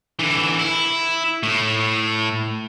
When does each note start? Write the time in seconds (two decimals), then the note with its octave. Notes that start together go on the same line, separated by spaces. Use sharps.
0.19 D3 E3
0.59 E4
1.43 A2